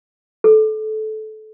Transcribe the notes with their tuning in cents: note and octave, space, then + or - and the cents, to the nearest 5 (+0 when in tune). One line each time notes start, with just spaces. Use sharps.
A4 -20